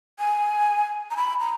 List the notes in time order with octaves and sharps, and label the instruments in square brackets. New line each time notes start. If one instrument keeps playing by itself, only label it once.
[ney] G#5
A#5
B5
A#5